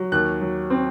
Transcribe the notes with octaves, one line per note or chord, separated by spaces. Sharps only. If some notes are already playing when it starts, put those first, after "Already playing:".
Already playing: F#3
D#2 F#6
F#3
C4